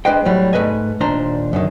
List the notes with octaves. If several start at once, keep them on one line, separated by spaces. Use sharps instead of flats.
G#3 D4 B4 C5 D#5 G5
A2 F#3 G3
G#2 A3 B4 D#5 G#5
D#2 A#2 D4 C5 A#5
F#2 D3 D#3